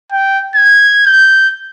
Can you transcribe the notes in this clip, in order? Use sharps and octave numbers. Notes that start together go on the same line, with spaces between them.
G5
G#6
G6